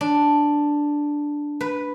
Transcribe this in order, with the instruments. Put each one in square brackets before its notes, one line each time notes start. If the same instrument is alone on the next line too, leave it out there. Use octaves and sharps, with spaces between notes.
[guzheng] D4
B4